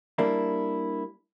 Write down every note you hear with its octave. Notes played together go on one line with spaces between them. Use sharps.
G3 A#3 D4 E4